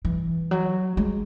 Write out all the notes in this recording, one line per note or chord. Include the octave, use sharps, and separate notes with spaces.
E3
F#3
G#3